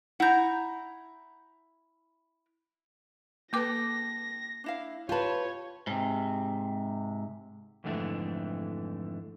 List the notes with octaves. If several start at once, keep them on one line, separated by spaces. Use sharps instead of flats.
E4 F#5 A#5 G6
A#3 A4 B4 G5 D6 A#6
D4 E4 F5
F4 G4 B4 C#5 A5
G#2 C3
F2 G#2 D3 E3 A3